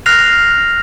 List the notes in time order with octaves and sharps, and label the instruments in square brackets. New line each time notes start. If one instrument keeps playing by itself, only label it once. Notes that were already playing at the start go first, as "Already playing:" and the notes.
[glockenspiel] F6 F#6 A#6 C7 F7